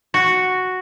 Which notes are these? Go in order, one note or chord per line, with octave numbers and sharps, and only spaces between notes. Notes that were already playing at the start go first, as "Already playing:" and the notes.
F#4